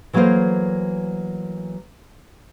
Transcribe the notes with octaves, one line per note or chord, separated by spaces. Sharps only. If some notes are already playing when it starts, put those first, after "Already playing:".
E3 F#3 A3 A#3 A#4 C5